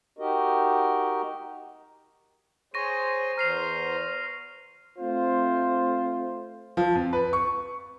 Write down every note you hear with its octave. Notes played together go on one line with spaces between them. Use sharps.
D#4 F#4 G4 A#4 D#5
G#4 C5 C#5 C#6 A#6 D#7
E2 C5 A#5 F6 C7 F7
A3 C4 F4 C5
F3
F2
B4
C#6